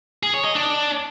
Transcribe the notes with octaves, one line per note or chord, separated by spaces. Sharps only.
G#4
C#5
D#5
D4